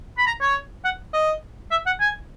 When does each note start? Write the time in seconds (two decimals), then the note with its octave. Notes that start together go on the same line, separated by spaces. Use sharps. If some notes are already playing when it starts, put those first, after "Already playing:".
0.18 B5
0.27 A#5
0.41 C#5
0.85 F#5
1.14 D#5
1.71 E5
1.86 F#5
2.00 G#5